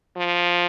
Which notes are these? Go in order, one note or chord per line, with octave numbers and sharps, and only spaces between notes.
F3